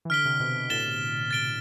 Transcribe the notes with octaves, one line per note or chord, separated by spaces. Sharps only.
E3
D3 F6 B6 D7 G7
C3
B2
B2
A2 A6 E7 G7
A6 D7 G7